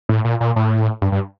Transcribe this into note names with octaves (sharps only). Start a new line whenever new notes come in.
A2
A#2
A#2
A2
G2
G2